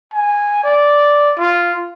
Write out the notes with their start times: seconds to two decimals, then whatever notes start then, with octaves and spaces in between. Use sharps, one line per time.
0.13 G#5
0.64 D5
1.38 F4